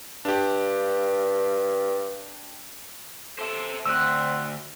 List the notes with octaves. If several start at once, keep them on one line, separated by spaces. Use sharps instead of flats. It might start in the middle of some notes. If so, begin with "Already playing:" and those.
G2 D4 G4
A4 C5 E5
D2 C4 E6 F#6